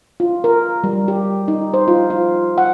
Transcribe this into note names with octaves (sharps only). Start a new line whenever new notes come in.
F4
A#4
G3
G4
D#4
C5
F4
F4
F#5